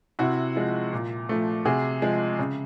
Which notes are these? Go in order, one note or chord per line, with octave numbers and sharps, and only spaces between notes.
C3 E4 F#4
F3 G#3
A#2
F3 A3
C3 F#4 G#4
F3 G#3
C#3